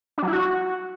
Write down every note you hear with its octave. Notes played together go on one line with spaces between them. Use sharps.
D4
F#3
E4
F#4